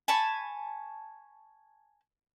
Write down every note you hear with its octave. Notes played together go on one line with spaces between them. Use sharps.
G#5 A5 B5 C#6